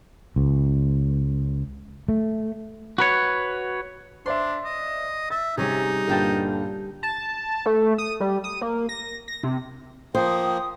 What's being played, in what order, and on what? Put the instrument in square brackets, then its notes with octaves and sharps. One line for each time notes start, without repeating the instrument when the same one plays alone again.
[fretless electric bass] C#2
A3
[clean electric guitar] F#4 B4 C#5
[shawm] D4 [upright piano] C5 D5 E5 [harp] C6
[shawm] D#5
[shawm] E5 [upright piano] A6
[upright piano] C3 [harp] G3 C#4 G#4 [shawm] D#4
[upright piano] G2 A#2 D3 [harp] F5 G5 A5
[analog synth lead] A5
A3
D#6
G3
D#6
A#3
A#6
A#6
C3
[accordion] F3 A#3 [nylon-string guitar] C5 [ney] G5 [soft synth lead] D#6